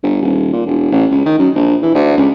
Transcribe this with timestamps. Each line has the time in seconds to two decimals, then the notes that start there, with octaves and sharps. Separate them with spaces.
0.03 G1
0.22 D#1
0.53 A#2
0.66 E1
0.92 A1
1.11 C#2
1.26 D#3
1.38 F#2
1.55 A#1
1.82 E3
1.95 D2
2.18 C#2